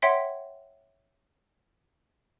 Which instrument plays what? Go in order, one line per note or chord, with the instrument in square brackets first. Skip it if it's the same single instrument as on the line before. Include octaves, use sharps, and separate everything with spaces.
[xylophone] C#5 E5 F#5 G5 C6 B6